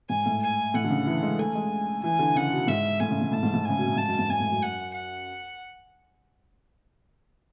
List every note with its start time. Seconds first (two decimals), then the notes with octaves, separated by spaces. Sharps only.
0.09 G#2 G#5
0.26 A2
0.42 G#5
0.74 A2 F#5
0.84 D3
0.90 C#3
1.06 E3
1.23 G#3
1.39 A3 G#5
1.55 G#3
2.03 E3 G#5
2.19 D3
2.36 C#3 F#5
2.52 B2
2.68 G#2 E5
3.00 A2 G#5
3.11 C#3
3.22 A2
3.32 A2 A5
3.43 G#2
3.54 G#2
3.65 C#3 G#5
3.78 B2
3.88 A2
3.96 G#2 A5
4.08 F#2
4.19 G#2
4.30 G#2 G#5
4.40 A2
4.51 F#2
4.62 F#5
4.93 F#5